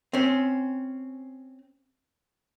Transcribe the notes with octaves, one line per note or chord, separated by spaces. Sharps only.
C4 C#4